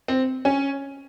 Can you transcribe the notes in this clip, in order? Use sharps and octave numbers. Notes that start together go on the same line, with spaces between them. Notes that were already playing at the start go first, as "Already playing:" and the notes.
C4
C#4